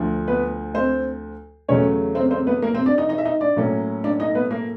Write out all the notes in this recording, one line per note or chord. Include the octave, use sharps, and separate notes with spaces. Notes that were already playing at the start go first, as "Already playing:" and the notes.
Already playing: D2 D3 F3
B3 B4
C4 C5
E2 C#3 F#3 A3 C#4 C#5
C4 C5
C4 C5
B3 B4
A#3 A#4
C4 C5
D4 D5
D#4 D#5
D#4 D#5
E5
D#4 D#5
D4 D5
A2 F#3 A#3 C#4
D4 D5
D#4 D#5
B3 B4
A#3 A#4